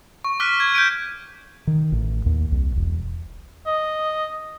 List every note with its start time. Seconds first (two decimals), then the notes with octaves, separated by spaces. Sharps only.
0.24 C#6
0.40 D6 F6 F#6 B6 D#7
0.60 G#6
0.74 G6 G#6 D7 D#7
1.67 D#3
1.92 A1
2.26 D#2
2.52 C2
2.76 E1
3.66 D#5